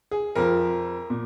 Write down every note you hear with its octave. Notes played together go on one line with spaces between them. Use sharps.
G#4
F2 F3 A#4
A#2